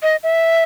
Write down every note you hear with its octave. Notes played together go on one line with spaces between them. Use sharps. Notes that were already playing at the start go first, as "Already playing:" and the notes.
D#5
E5